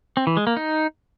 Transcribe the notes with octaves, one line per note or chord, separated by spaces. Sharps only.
C4
E3
G#3
A#3
D#4